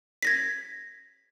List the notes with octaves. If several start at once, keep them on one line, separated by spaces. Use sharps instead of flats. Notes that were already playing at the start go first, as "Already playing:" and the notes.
G#6 A#6 B6